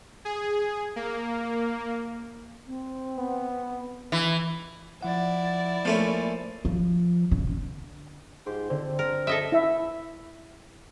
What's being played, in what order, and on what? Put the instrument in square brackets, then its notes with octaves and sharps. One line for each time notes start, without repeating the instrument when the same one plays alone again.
[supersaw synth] G#4
A#3
[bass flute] C4
[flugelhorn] B3
[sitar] E3
[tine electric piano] F3 F#5 [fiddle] E4 D5
[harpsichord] F3 A3 C#4 [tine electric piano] A#3 A#4
[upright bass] F3
C#3
D3
[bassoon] G#2 [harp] F4 G4 C6
[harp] D3 [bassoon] C4
[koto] A#4
A4 D#5 E5
[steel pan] E4 E5